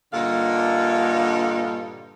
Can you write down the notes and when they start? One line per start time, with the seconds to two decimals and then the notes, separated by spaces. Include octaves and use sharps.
0.13 G2 A#2 D3 D#4 A4 F5